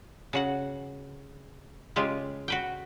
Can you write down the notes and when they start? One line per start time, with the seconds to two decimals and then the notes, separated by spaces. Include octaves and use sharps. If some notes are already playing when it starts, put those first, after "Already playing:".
0.33 C#3 F#4 F#5
1.96 C#3 G#3 F4 G4
2.48 F#4 B4 G5